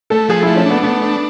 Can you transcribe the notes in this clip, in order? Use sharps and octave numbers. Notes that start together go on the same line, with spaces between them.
A3 A4
F3 G#4
E4
A3
C#4
B3 D4
A3 B3
D4